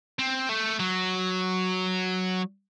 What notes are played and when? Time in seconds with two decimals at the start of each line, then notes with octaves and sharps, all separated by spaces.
0.19 C4
0.49 A3
0.79 F#3